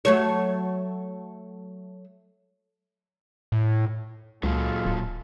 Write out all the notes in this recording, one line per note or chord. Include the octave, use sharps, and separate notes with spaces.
F#3 A3 C#5
A2
C#2 A#2 F#3 G#3 F4 A4
D1